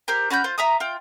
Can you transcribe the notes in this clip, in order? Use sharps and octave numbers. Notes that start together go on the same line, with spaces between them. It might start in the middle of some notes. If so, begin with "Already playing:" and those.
G4 A#4 C5
C#4 F#4 B5 G6
F4 C5
E5 A#5 D#6
F4 G5